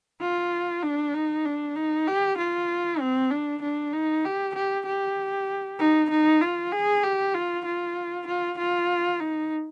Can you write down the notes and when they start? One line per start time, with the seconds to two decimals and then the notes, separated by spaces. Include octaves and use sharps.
0.21 F4
0.83 D4
1.14 D#4
1.45 D4
1.76 D#4
2.07 G4
2.38 F4
3.00 C4
3.31 D4
3.62 D4
3.93 D#4
4.24 G4
4.55 G4
4.86 G4
5.79 D#4
6.10 D#4
6.41 F4
6.72 G#4
7.03 G4
7.34 F4
7.65 F4
8.27 F4
8.58 F4
9.20 D#4